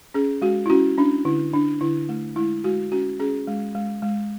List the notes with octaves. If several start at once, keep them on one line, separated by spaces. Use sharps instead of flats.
C#4 G#4
G#3 F#4
E4
C#4 F#4
C#4 D4
D3 E4
D4
D3 E4
A3
G#3 E4
G#3 F#4
C#4 F#4
C#4 G#4
G#3
G#3
G#3